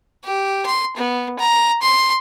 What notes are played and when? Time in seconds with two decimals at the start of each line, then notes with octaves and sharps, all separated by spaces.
0.24 G4
0.66 C6
0.96 B3
1.39 A#5
1.82 C6